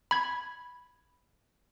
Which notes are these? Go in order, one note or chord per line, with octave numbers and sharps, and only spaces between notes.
B5 G#6